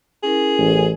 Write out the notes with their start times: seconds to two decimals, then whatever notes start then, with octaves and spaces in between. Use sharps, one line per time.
0.23 C#4 E4 G#4 A#4
0.58 A1